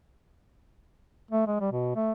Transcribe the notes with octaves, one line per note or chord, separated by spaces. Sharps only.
A3
G#3
G3
B2
A3